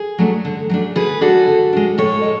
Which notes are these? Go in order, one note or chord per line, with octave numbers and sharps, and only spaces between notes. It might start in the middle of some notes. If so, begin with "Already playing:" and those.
Already playing: G#4
F#3 A3 D4
D3
F#3 A3 D4
D3 G#4 B4
G#3 D4 F#4 A4
D3
G#3 D4
A2 A4 C#5
G#3